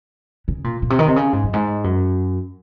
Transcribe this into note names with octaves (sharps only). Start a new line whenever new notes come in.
C#3
A#2
A#2
C3
D#3
C3
C#3
G#2
F#2
G#2
F#2